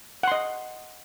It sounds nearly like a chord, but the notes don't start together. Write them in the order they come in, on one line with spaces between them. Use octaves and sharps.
F#5 C6 D#5